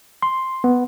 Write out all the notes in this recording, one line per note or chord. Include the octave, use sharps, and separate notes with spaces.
C6
B3